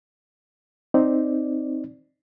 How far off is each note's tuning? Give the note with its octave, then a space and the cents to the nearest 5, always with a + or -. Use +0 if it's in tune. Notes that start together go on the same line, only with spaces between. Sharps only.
C4 +0 D#4 +0 D5 +0